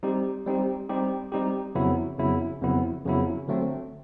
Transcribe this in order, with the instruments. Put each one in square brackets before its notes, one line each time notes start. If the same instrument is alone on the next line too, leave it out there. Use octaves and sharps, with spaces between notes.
[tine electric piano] G3 C4 D#4 G4
G3 C4 D#4 G4
G3 C4 D#4 G4
G3 C4 D#4 G4
F2 C#3 F#3 B3 E4
F2 C#3 F#3 B3 E4
F2 C#3 F#3 B3 E4
F2 C#3 F#3 B3 E4
D3 F#3 A3 C4